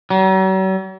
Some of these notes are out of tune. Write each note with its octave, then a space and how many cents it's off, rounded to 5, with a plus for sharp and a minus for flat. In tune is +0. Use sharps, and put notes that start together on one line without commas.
F#3 +45